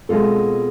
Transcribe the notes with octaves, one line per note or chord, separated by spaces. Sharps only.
B2 G#3 C4 F4 A4